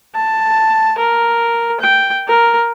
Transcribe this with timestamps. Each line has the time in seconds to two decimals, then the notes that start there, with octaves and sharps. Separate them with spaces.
0.15 A5
0.98 A#4
1.80 G5
2.27 A#4